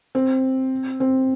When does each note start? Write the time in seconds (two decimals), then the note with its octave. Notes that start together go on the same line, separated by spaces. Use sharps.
0.15 C4
1.00 C4